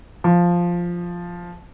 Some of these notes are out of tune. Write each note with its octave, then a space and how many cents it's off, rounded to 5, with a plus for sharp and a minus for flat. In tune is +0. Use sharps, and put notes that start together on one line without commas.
F3 +0